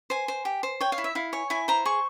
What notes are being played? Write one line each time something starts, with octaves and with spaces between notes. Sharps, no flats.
C5 G#5
C5
G4
C5
C#5 G5
F5
E4
E5
E4 F5
C#5 G#5
E4 G#5
C5 A#5
G#4 C#6